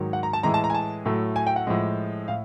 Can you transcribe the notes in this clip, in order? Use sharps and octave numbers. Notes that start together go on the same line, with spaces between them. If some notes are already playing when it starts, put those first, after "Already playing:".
Already playing: G#2 D#3 F#3
F#5
A#5
A5
A2 E3 G#3 A#5
A5
A#5
G#5
A5
A2 F#3 A3
G#5
G5
F#5
A2 F3 G#3
A2 F5